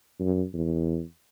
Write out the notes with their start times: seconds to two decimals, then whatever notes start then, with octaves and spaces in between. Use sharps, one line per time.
0.20 F#2
0.54 E2